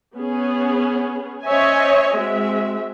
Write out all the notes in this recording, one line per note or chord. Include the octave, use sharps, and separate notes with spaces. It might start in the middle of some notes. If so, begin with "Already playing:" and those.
B3 C#4 G#4
C#4 C5 C#5 D#5 E5 G#5
G#3 C4 F#4 E5